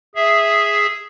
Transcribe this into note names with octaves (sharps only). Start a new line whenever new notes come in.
G#4 E5